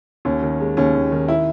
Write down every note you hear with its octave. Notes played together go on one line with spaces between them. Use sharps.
D#2 C#4
D#3
G#3
D#2 C#4
D#2
D#3
E4